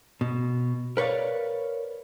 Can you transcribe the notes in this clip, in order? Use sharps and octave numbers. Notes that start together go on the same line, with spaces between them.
B2
A#4 B4 C#5 D5 F5